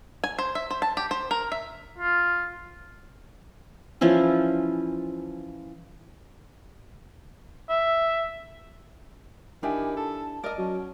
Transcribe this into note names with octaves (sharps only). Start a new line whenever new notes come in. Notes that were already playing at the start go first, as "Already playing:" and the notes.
G#5
C5
E5
C5
A5
G4
C5
A#4
E5
F4
E3 F3 C#4 E4
E5
D#3 D4 E4 G4 G#5
A4 A5
A#4 D5 D#5
F#3 C#4